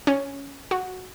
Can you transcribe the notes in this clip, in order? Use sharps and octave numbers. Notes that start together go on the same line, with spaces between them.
C#4
F#4